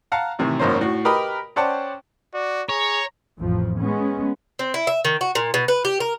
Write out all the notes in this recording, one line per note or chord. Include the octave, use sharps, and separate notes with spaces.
F5 F#5 A5 A#5
A2 C3 D#3 E3
G#1 F#2 A#3 C#4 C5
A2 F#4
G4 A#4 B4 D#5 B5 D#6
C#4 C5 D5 F#5 G5 A5
F#4 D5
G#4 C#5 A#5
A1 F2 F3
G#3 B3 C#4
C4
E4
E5
D#3
F#4
A#2
B2
B4
G4
A#4